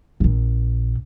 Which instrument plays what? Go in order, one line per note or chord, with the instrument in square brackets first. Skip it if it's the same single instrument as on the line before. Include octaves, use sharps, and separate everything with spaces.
[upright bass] A#1 A#2